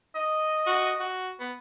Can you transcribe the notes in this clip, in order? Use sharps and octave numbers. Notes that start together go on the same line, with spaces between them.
D#5
F#4
F#4
B3